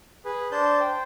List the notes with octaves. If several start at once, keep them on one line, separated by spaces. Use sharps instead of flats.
G#4 B4
D4 C5 A5 G6
C5 G5